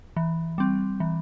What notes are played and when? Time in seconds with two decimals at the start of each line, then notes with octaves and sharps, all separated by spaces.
0.17 E3
0.58 G3 C4
1.00 E3